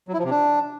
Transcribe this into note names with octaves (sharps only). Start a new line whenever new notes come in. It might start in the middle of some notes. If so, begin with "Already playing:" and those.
F#3
E4
F3
C3
D4